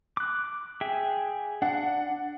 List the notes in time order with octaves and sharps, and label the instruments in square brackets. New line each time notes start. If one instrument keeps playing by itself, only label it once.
[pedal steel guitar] D6 F#6
G#4 E5 G5
[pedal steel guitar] D4 [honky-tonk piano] F#5